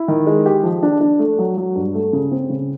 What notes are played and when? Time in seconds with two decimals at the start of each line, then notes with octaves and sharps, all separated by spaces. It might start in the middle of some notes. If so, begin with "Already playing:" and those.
Already playing: E4
0.08 D#3
0.27 G#3
0.46 G4
0.63 F3
0.83 D4
1.01 D4
1.19 A3
1.39 F#3
1.57 F#3
1.75 G2
1.94 A3
2.13 C#3
2.31 C4
2.50 C#3